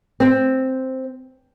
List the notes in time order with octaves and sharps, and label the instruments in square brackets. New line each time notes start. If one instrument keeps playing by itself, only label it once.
[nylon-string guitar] C4